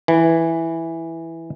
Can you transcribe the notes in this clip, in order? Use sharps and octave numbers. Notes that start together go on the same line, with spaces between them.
E3